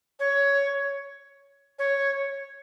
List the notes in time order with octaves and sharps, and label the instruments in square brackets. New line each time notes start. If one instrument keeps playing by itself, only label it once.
[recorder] C#5
C#5